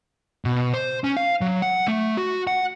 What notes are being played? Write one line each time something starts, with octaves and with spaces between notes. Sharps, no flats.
B2
C5
C#4
F5
F#3
F#5
A3
F#4
F#5